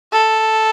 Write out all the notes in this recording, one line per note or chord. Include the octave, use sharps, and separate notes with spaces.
A4